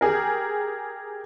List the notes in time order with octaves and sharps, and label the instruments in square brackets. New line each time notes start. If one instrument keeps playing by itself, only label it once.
[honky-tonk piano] G4 G#4 A#4